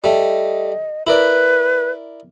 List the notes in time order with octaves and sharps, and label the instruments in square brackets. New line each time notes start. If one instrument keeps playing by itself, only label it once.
[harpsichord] G3 A3 [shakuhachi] D#5
[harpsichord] E4 A#4 D5 [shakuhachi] B4